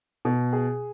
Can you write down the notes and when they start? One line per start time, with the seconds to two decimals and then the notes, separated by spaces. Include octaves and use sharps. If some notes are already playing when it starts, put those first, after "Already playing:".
0.25 B2
0.53 G#4